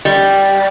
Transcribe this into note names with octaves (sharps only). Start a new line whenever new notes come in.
G3